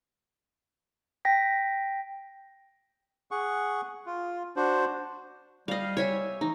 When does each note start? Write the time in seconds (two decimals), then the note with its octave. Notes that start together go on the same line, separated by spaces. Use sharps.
1.25 G5 A#6 B6
3.31 G#4 F#5 C#6
4.06 F4
4.56 D4 F#4 C5
5.68 G3 D#5 F5
5.97 C#5 E5 G#5
6.41 E3 D#4